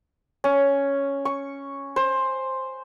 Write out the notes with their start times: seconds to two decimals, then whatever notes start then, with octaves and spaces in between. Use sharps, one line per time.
0.44 C#4
1.25 C#6
1.96 C5